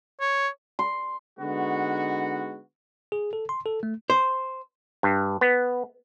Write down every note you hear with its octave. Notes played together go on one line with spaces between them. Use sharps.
C#5
C6
D3 G#3 B3 D#4 F#4
G#4
A4
C6
A4
A3
C5
G2
B3